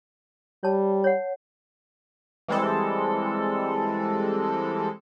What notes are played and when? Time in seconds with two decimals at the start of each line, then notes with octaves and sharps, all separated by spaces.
0.63 G3 C#5 A5
1.04 C#5 F#5
2.48 E3 G3 G#3 C4 A4